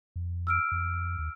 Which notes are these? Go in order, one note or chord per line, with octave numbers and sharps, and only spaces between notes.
F2
E6 F6 D7
F2
D#2